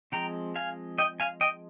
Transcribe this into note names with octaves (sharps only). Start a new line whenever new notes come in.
F3 G#3 C4 G5 A#5
F5 G#5
D#5 G5
F5 G#5
D#5 G5